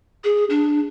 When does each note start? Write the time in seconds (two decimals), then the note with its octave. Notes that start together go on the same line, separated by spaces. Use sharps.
0.24 G#4
0.50 D4